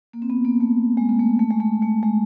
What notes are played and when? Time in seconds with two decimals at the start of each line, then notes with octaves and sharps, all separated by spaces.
0.13 A#3
0.22 C4
0.30 B3
0.45 A#3
0.60 A3
0.97 G#3
1.09 A#3
1.19 A3
1.39 A3
1.50 G#3
1.60 A3
1.82 A3
2.03 G#3